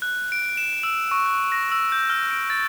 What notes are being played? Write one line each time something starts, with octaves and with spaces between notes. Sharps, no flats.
F#6
D7
E7
E6
C#6
F#6
A#6
E6
G6
F6
D7
A6